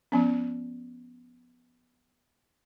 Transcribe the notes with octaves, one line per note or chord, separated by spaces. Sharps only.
F3 B3 C#4